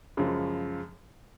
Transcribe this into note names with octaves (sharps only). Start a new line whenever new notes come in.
F#2 C#3 F3 G#3